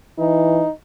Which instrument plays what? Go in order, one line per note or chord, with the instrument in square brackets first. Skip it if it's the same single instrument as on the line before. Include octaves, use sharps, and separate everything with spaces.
[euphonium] E3 [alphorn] D#4